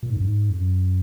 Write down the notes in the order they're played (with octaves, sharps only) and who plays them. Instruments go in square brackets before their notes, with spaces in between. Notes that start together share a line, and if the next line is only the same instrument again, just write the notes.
[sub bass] A#2
G#2
F#2
G#2
F2
F#2